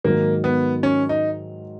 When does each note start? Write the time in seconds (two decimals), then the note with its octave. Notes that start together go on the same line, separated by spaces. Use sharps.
0.04 G#2 D#3 F#3 A#3
0.44 B3
0.83 C#4
1.09 D#4